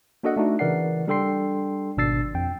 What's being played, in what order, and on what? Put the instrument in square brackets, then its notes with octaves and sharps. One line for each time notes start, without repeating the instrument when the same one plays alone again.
[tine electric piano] A#3 D4 F#4 A4 D#5 F#5
A3 D4 D#4 F#4
C#3 E3 A#4 D5 F#5 C7
G3 D4 A4 G5 C6 C7
G#1 B2 D4 E6 A6 C7
F2 G5